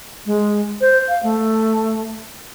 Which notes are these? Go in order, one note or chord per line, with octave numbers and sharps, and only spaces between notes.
G#3
C5
F5
A3